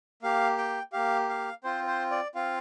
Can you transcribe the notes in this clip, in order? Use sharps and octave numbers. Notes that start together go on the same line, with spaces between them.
A#3 G4 F5
G5
A#3 G4 F5
F5
C4 F4 C5
C5
D5
C4 F4 F5